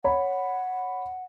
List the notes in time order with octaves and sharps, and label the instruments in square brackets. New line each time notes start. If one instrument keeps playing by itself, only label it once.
[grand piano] C#5 B5 [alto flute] F#5